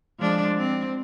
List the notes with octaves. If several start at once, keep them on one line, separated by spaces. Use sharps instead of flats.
F3 G#3 D4
C4